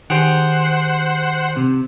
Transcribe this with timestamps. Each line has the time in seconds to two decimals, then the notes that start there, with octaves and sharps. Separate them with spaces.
0.10 D#3 G4 G#4 C5 F#5
1.56 C3